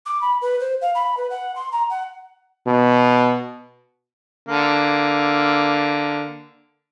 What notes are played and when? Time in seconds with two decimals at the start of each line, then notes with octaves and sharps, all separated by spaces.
0.05 D6
0.21 B5
0.41 B4
0.60 C5
0.81 F5
0.94 B5
1.16 B4
1.30 F#5
1.55 C6
1.71 A#5
1.89 F#5
2.67 B2
4.48 D3 A#3